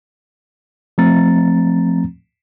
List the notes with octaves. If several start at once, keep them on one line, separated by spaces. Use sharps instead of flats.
F3 A3 C4 A#5 A6